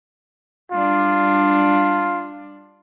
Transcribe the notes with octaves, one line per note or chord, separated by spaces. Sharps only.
G3 D4 F4